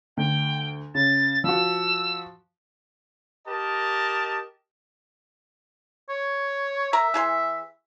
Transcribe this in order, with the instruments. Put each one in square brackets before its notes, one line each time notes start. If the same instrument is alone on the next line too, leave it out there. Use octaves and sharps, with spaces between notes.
[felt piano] D2 [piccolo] G5
[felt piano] C#3 [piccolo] A6
[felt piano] F3 F#4 [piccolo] E6
[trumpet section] G4 A#4 D#5 A5
[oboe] C#5
[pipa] A#4 A#5 [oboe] E5
[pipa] E3 G#4 C6